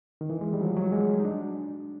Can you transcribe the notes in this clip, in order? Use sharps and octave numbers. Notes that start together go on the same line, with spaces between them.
D#3
E3
G#3
G3
F#3
F3
F#3
G#3
D#4
D4